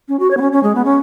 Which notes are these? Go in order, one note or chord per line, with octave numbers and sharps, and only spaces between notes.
C#4
F#4
C#5
B3
C#4
C#4
G#3
B3
C#4